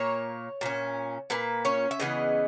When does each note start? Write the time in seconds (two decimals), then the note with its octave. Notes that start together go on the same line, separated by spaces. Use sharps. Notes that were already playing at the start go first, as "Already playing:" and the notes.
Already playing: A#2 A#3 C#5
0.61 A#2 A#3
0.66 C#4
1.30 A#2 A#3 B4
1.65 C#4 C#5
1.91 E5
2.00 C#3 E3 B3 D#5